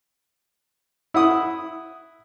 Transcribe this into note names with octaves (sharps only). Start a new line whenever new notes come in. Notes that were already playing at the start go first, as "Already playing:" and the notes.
E4 F#5 D#6